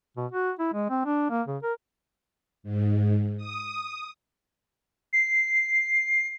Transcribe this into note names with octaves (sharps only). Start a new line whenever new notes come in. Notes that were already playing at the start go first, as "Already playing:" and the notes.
B2
F#4
E4
G#3
C4
D4
A#3
C#3
A#4
G#2
D#6
C7